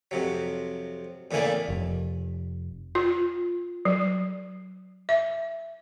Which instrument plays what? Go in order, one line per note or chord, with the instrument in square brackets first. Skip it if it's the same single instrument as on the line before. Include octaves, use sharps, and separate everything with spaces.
[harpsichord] F2 C3 F#3
E2 A2 C#3 E3 A#3 D5
[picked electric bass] F1
[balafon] F4
F#3
E5